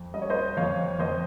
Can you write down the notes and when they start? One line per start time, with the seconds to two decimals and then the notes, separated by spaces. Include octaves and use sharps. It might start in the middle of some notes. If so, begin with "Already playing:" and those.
Already playing: F2
0.14 G3 D#5
0.22 C#5
0.30 C5 D#5
0.57 F2 C#5 F5
0.99 F2 C5 D#5